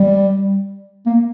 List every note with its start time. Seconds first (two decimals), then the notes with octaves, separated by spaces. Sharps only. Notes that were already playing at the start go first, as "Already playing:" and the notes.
Already playing: G3
1.06 A#3